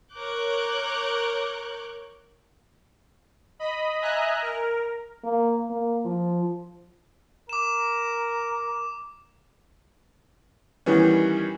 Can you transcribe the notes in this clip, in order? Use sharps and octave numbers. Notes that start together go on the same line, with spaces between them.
A#4 C#5 D6 F#6 G6
D#5 B5
D#5 E5 G#5 A#5 F#6
A#4
A#3
A#3
F3
A#4 D6 E7
D#3 E3 G3 B3 C#4